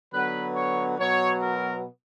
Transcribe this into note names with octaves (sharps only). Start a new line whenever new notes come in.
D3 F#3 B3 B4
C#5
B2 F#3 B3 C#5
A#4